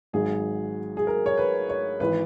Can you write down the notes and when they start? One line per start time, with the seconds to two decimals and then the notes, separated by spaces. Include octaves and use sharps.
0.13 G#1 G#2 F#3 G#4
0.97 G#4
1.07 A#4
1.26 C#5
1.38 B4
1.69 C#5
2.00 G#1 E3 B4